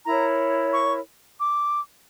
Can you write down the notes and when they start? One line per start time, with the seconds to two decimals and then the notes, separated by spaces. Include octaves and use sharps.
0.06 E4 A#4 C#5 A#5
0.73 C#6
1.40 D6